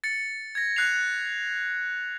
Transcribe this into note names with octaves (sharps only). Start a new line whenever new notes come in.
A6 C#7
G#6 A#6
F#6 C7 F7